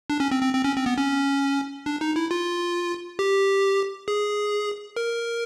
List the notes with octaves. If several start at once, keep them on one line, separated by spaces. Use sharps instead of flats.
D4
C#4
C4
C4
C4
C#4
C4
B3
C#4
D4
D#4
E4
F4
G4
G#4
A#4